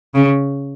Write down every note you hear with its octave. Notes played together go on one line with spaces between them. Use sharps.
C#3